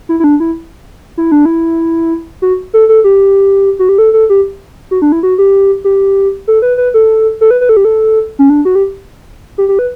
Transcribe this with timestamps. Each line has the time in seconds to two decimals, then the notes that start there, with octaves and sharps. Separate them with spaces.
0.09 E4
0.20 E4
0.24 D4
0.40 E4
1.18 E4
1.32 D4
1.45 E4
2.42 F#4
2.74 A4
2.89 A4
3.04 G4
3.79 F#4
3.89 G4
3.98 A4
4.13 A4
4.30 G4
4.91 F#4
5.02 D4
5.12 E4
5.23 F#4
5.38 G4
5.84 G4
6.48 A4
6.62 B4
6.77 B4
6.94 A4
7.41 A4
7.51 B4
7.61 B4
7.69 A4
7.77 G4
7.85 A4
8.39 C#4
8.50 D4
8.65 F#4
8.75 G4
9.58 G4
9.69 G4
9.79 B4